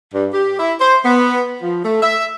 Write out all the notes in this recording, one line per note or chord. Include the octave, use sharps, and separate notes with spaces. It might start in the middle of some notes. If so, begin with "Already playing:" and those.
G2
G4
E4
C5
B3
F3
A3
E5